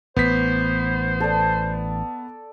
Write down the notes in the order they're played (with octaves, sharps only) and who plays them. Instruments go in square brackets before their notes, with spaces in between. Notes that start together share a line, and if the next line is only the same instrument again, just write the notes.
[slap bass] A1 [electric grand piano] B3 B6 [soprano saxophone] C5
[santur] A4 D5